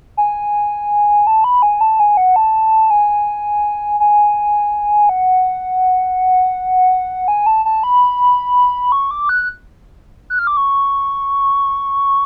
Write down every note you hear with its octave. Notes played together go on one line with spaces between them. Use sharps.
G#5
A5
B5
G#5
A5
G#5
F#5
A5
G#5
G#5
F#5
G#5
A5
A5
B5
C#6
D6
F#6
F#6
F6
D6
C#6